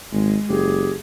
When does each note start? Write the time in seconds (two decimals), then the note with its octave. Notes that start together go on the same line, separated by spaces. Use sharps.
0.12 G#1 G#3
0.49 F#1 G4 G#4